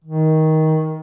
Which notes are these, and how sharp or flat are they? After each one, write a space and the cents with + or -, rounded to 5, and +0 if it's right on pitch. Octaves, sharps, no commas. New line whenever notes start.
D#3 +15